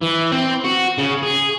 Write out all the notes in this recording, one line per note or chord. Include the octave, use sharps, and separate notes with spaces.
E3
C4
F#4
C#3
G#4